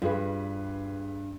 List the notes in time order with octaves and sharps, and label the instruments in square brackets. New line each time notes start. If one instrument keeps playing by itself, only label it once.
[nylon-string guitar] G2 [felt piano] F4 G#4 B4